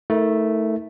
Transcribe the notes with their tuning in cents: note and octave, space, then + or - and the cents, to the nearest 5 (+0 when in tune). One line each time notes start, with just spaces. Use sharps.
A3 +0 D#4 +45 A#4 +0